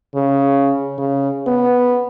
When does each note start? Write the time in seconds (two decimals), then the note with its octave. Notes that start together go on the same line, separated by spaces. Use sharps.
0.15 C#3
0.98 C#3
1.47 B3